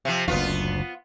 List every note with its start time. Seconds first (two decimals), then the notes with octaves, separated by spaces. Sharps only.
0.05 C3 F3
0.28 F#1 D2 B3 F4